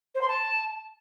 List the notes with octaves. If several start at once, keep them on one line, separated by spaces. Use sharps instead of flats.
C5
C6
A5